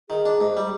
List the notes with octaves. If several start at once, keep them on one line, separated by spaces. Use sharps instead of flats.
D#3 G#4
D4
G#2
G3